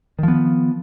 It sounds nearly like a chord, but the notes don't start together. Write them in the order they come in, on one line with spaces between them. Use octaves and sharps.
D#3 F3 B3